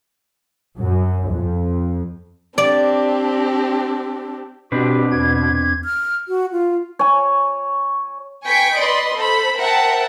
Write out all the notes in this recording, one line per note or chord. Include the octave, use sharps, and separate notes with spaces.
F#2
F2
C4 D4 G4 D5
B2 C4 D4 F#4 G4 B4
E2 G#6
F6
F#4
F4
C#5 G#5
B4 G5 G#5 C#6 B6 D7
B4 D5 D#5 B5 C6
A4 C5 B5
A#4 C5 E5 F#5 G5 A5